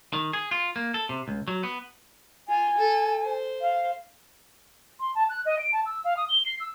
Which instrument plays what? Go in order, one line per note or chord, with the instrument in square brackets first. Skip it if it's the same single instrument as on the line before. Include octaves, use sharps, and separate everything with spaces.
[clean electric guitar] D#3
G#4
F4
A#3
A4
C3
C#2
F#3
B3
[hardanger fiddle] F4 [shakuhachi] G#5
[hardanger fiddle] A4
C5
[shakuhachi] F5
[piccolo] C6
A5
F#6
D#5
D7
A5
E6
F5
D#6
G7
C7
E6